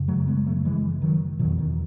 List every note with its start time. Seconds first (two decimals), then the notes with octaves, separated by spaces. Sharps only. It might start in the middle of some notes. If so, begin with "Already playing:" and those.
Already playing: F#2 C#3
0.08 F#3 A3
0.27 G#3 B3
0.46 F#3 A3
0.65 E3 G#3
1.02 D#3 F#3
1.39 B2 D#3 F#3
1.44 E2
1.59 D#3